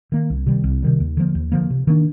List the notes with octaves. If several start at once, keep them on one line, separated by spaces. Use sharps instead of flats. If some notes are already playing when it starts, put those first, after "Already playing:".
D#3 A#3
C2
C3 D#3 G3
C2
C3 D#3 G3
D#2
D3 F3 A#3
D#2
D3 F3 A#3
C3
D#3 A#3 D4